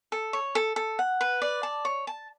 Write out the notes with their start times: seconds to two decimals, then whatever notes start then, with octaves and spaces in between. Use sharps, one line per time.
0.12 A4
0.33 C#5
0.55 A4
0.76 A4
0.99 F#5
1.21 B4
1.42 D5
1.63 A5
1.85 C#5
2.07 A5